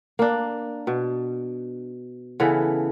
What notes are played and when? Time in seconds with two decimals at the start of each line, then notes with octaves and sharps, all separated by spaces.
0.19 A#3 D4
0.87 B2
2.40 C#3 E3 B3 A4